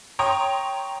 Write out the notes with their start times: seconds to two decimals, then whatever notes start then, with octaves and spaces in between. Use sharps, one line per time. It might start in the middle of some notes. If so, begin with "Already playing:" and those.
0.19 C#5 G5 A#5 C6 D#6